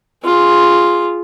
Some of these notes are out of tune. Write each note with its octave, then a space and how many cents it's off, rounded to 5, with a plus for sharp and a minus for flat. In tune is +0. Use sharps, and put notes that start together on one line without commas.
F4 +0 G#4 +0